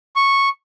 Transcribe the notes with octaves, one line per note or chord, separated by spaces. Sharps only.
C#6